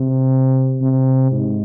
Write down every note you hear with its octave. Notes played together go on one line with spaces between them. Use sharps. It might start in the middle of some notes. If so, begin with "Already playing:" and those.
Already playing: C3
C3
G#2